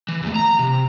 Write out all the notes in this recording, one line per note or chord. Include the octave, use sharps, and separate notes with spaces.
E3
E2 A3
A#5
C3